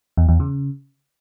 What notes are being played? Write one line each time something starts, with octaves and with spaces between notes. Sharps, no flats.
E2
E2
C#3